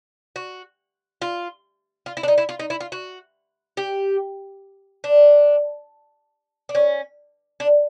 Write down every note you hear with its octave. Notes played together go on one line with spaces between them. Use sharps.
F#4
F4
F4
E4
D4
D#4
E4
F4
D#4
E4
F4
F#4
G4
D4
D4
C#4
D4